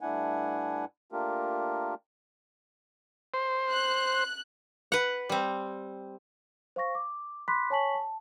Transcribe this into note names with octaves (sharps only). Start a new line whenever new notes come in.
G2 A3 D4 E4 F#5 G#5
A3 A#3 D4 F4 G4 A#4
C5
F#6
B4 F#5
G3 C4
C5 F5 C#6 A#6
D6
B5 C6 D6 F#6 B6
C#5 G#5 A5 C#6 B6 F#7
A5